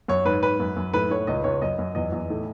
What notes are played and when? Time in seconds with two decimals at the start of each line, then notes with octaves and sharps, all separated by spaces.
0.08 F#2 C#5
0.25 G#2 B4
0.42 G#2 B4
0.60 F#2
0.76 F#2
0.94 A2 B4
1.10 A2 C#5
1.27 C#2 D#5
1.44 C#2 C#5
1.62 F#2 D#5
1.79 F#2
1.95 E2 D#5
2.12 E2
2.30 A2